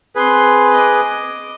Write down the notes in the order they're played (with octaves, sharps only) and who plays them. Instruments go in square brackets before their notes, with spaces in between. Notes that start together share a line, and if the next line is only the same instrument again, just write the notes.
[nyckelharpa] C4 C6 [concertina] G#4 B4
[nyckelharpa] D#5 D6